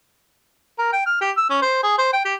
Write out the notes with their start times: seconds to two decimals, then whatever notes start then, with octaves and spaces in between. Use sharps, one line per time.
0.78 A#4
0.93 G5
1.06 F6
1.21 G4
1.37 E6
1.50 C#4
1.62 C5
1.83 G#4
1.98 C5
2.13 G5
2.25 G4